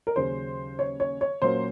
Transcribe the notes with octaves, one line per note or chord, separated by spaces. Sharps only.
A#4
D#2 C#3 F#3 C#4 C5
C#5
C#5
C#5
A#2 F#3 A#3 C#4 C5